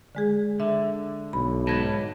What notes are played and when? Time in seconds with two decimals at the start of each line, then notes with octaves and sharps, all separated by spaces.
0.15 D3 G#3 G#4
0.60 D3 E5
1.33 B1 B5
1.67 G#2 B4 C#5 A5 G#6 A#6